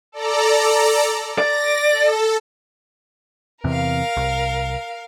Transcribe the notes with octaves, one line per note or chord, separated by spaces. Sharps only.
A4 D5 A#5
D5 A#6
A4
E2 C3 A#4 F5
C2